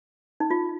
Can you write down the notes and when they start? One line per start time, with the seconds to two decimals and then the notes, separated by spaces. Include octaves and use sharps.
0.40 D#4
0.51 F4